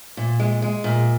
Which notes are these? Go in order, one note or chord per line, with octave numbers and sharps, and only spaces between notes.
A#2
G#3
G#3
A#2